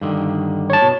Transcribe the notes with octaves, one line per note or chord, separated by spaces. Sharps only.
G2 D3 D#3
C#5 A5
B2